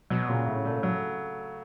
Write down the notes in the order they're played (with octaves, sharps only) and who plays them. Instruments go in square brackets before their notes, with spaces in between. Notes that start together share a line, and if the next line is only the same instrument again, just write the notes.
[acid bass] B2 [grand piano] F#3
[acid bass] A#2 [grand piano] C#3
[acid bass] A2 [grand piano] C#3
[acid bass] A#2 [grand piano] A3
[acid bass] A2 [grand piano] F#3